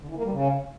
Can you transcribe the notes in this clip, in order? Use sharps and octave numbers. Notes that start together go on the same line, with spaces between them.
D3
E3
A#3
G3
C#3